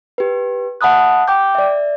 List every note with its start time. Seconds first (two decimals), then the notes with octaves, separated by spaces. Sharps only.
0.18 G4 B4
0.81 E5 F#5 A5 B5 D#6 F#6
1.28 G5 D6 G6
1.55 D5 E5